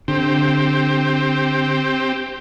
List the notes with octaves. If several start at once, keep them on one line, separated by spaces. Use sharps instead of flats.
D3 C4 G4